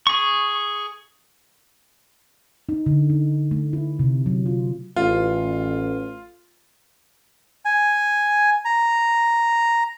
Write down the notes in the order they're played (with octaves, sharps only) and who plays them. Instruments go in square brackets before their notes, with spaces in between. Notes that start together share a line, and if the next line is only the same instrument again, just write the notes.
[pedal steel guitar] G#4 C#6
[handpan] D#4
D3
D#4
A3
E4
C3
F#3
F4
[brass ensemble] A1 [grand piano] F4
[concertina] G#5
A#5